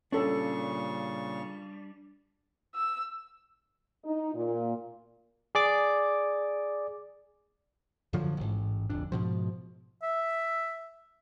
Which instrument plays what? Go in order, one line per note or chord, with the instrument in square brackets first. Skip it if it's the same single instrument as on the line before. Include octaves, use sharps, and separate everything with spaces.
[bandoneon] A#2 C#3 C#6 [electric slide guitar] G3 D4 [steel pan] C#4 A4
[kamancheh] E6
[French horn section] D#4
A#2
[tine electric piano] G#4 D5 D6
[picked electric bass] F#2 D3 F3 F#3
A1 G#2
D1 G1 F2 D4
G#2 B2 F3
[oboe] E5